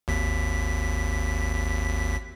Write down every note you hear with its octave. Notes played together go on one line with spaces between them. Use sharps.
G#1 D#2 B6